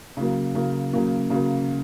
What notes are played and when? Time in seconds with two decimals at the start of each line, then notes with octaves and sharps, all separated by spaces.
0.17 C#3 F#3 A#3
0.55 C#3 F#3 A#3
0.93 C#3 F#3 A#3
1.30 C#3 F#3 A#3